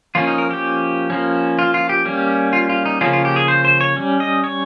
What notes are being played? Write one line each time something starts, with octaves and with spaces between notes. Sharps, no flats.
F3 A#3 C#4 F4
D#4
A#4
G4
F3 A#3 C#4
F4
F4
G4
G3 A#3 C#4
F4
F4
D#4
C#3 F3 A#3 C#4 F4
F4
G4
G#4
C5
C5
C#5
G3 C#4
D#5
C#5